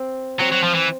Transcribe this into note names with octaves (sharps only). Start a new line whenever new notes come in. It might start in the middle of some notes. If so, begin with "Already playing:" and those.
Already playing: C4
F#3 C4
F#3
F3
E3